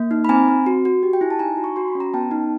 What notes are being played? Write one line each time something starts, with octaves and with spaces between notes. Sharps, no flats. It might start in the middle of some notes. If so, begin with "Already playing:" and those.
Already playing: A#3
D#4
B5
C4 G#5 A#5
C4
F#4
F#4
G4
G5
E4 G#5
A5
D#4 G#5 A#5
F#4
C#6
F#4 C6
B5
C#4
A#5
B3 G5 A5
D#4